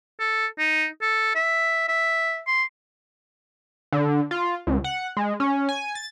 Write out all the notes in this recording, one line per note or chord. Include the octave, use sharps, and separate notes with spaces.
A4
D#4
A4
E5
E5
C6
D3
F4
C#2
F#5
G#3
C#4
G#5
A6